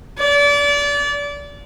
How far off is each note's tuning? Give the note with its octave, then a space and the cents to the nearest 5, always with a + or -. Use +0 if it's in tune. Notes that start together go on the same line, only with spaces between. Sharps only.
D5 -30